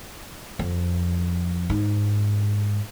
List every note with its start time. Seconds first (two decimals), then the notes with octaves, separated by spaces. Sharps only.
0.59 F2
1.70 G#2